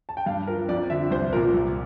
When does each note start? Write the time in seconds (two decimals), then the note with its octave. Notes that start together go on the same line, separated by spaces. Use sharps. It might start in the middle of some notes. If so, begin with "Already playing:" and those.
0.09 A5
0.17 G5
0.26 G2 F5
0.47 F3 A#4
0.69 F2 D5
0.90 D3 F3 E5
1.11 C2 C5
1.33 A#2 F3 A#4
1.54 C2